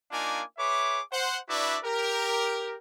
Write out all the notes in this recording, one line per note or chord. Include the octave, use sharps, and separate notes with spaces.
A#3 D4 D#4 F4 G#5 D6
G#4 B4 C#5 E5 D6
C5 F#5
D4 E4 F#4 B4 D5 E5
G4 A#4